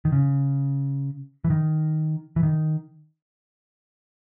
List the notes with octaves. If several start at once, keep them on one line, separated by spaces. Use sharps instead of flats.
D#3
C#3
E3
D#3
E3
D#3